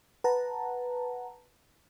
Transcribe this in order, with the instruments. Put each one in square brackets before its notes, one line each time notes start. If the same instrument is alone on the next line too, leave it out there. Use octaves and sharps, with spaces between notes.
[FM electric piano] B4 F#5 A5 A#5